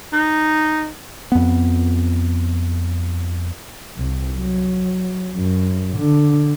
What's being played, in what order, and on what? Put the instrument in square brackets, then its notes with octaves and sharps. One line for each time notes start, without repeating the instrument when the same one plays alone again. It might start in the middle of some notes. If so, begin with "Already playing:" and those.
[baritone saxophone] D#4
[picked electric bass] F2 B3
[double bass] C2
F#3
F#2
D3